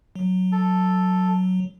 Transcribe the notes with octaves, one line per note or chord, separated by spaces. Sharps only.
F#3
A4